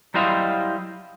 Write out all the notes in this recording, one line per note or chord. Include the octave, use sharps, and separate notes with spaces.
F#3 G3 E4 C5 D#5 F5